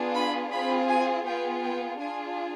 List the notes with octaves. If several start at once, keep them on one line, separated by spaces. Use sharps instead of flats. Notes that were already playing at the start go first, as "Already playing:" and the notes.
Already playing: B3 D4 F4 G#4
B5
C4 F4 G#4 B5
G#5
B3 F4 G#4 G5
G5
D4 F4 G#4 G#5